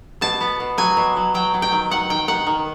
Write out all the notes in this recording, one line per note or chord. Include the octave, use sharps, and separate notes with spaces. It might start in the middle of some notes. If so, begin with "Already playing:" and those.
B2 A5
B3
B2
F#3 G#5
B2
F#3
F#3 G5
F#3
G5
D#3
D#3 F#5
D#3 G5
D#3 F#5
D#3